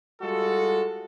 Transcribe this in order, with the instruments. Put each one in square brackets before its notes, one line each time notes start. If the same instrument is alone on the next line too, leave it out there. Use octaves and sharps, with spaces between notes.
[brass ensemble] G3 G#3 F4 F#4 A4